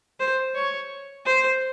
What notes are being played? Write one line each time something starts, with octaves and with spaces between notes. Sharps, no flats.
C5
C#5
C5